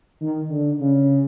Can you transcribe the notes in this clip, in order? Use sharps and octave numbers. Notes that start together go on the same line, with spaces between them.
D#3
D3
C#3